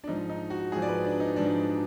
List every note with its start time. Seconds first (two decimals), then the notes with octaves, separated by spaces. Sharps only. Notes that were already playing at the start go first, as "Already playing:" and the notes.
0.04 D4
0.07 G#2 F3 D#4
0.30 D#4
0.50 F#4
0.72 G#2 F3 G#4
0.82 D5
0.89 B4
1.05 D4
1.20 D#4
1.36 G#2 F3 D4